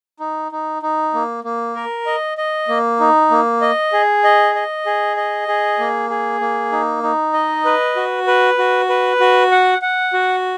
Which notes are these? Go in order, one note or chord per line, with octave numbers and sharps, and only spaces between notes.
D#4
D#4
D#4
A#3
A#3
A#4
D#5
D#5
A#3
D#4
A#3
D#5
G#4
D#5
D#5
G#4
D#5
G#4
A#3
G#4
A#3
D#4
D#4
D#5
B4
F#4
B4
F#4
B4
F#4
F#5
F#5
F#4